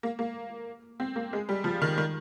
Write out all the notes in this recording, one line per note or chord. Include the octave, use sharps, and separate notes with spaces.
A#3
A#3
C4
A#3
G#3
G3
F3
D#3
D#3